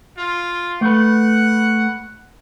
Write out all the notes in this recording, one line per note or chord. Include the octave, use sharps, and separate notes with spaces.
F4
A3 B4 F#5